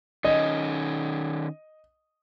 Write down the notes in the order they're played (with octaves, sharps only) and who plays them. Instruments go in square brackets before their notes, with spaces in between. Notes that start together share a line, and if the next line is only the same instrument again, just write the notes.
[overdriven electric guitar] D#3 C#4 [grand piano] D#5